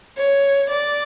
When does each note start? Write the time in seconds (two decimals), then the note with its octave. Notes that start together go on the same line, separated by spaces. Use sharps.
0.17 C#5
0.69 D5